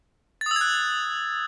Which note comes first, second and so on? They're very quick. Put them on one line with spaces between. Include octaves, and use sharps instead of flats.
A6 D#6 E6 G#6 F#6